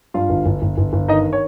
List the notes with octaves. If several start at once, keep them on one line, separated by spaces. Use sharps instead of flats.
G2 F4 F5
G1
G1
G1
G1
G1
D#3 D#4 D#5
C#5